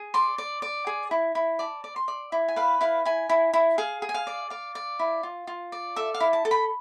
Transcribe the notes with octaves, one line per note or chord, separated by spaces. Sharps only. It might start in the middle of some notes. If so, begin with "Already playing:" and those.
Already playing: G#4
D5 C6
D5
D5
G#4
E4
E4
D5 A5
D5
C6
D5
E4
G#5
B4 F5
E4 F5
E4 G#5
E4
E4
G#4 F5
G#4
G#5
F5
D5
D5 F5
D5
E4
F4
F4
D5
A4 E5
F5
E4
A5
A4
B5